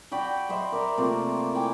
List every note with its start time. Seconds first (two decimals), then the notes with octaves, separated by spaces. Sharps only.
0.11 F#4 D5 G5 B5
0.49 C5 D#5 E5 B5
0.72 A#4 D5
0.97 C3 A3 A#3 F4
1.55 E4 G5 G#5 D6